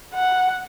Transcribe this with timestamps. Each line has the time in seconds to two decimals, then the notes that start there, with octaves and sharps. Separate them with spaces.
0.15 F#5